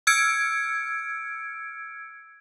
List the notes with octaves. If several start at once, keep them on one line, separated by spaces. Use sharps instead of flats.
E6 F6 G#6 C#7 D7